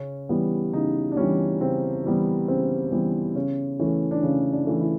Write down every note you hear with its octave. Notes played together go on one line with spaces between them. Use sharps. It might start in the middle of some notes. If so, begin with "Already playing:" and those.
Already playing: C#3 C#4
E3 G3 B3
C#3 D#4
D4
E3 G3 B3 C#4
C#3 C4
E3 G3 B3
C#3 C4
E3 G3 B3
C#3 C#4
E3 A3 C#4
D4
C#3 C#4
D4
E3 A3
E4